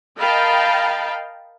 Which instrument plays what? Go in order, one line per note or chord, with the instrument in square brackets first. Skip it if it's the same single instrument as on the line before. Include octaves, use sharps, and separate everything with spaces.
[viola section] A#4 D#5 F5 G5 A5 B5